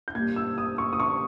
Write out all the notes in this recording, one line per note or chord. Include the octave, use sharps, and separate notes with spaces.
G6
A#2 G3 G#6
E6
D#6
C#6
D#6
C#6